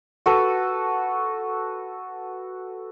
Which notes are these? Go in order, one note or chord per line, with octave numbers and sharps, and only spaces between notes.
F#4 A4 B4